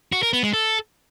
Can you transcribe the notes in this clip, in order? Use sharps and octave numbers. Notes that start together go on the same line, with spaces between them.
F#4
A#4
B3
G#3
A4